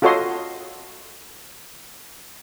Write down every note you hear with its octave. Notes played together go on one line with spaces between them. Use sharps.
F4 F#4 A4 C#5 D#5 C6